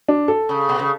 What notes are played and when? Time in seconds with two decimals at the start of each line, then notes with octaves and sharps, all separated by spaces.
0.08 D4
0.28 A4
0.49 C#3
0.69 B2
0.79 C#3